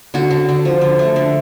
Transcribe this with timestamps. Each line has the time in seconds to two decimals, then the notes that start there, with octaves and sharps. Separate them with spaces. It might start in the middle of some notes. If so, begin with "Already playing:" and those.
0.14 D3 F#4
0.31 D3
0.49 D3
0.65 F3
0.81 D3
0.99 A3
1.16 D3